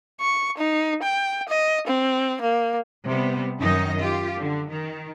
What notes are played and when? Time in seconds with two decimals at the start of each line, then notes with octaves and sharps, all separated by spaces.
0.20 C#6
0.58 D#4
1.03 G5
1.49 D#5
1.87 C4
2.41 A#3
3.04 C3 G3 B3
3.58 F#2 D#3 D#4 D#5
3.98 F4 G4
4.38 D3
4.69 D#3